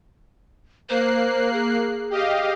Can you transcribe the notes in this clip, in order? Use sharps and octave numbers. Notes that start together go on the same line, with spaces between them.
A#3 C5 F#6 C7
G#4
G4 D#5 F5